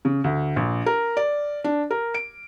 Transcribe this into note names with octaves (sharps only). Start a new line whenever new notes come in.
C#3
D2
A#1
A#4
D5
D4
A#4
D7